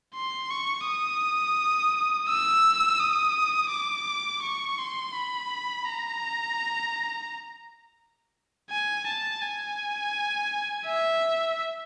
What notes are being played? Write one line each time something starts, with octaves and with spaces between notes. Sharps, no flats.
C6
C#6
D#6
E6
D#6
D6
C#6
C6
B5
A#5
G#5
A5
G#5
E5